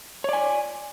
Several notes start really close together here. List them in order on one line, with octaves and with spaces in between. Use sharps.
C#5 D5 G#5